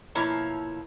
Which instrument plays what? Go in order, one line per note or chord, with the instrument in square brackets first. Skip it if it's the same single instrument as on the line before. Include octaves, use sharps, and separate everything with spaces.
[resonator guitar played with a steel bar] B2 F3 A#3 E4 C#5 A#5